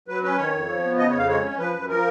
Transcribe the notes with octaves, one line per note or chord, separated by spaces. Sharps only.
F#3 B4
C#4 B4
D#3 C#5
F2
F3
B3
C#3 D#5
C#5
F2 F5
G#3 C#5
C#4
F3 B4
F#2
F3 A#4